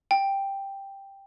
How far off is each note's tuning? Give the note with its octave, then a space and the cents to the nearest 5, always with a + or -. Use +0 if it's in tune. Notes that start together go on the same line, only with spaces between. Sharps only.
G5 +5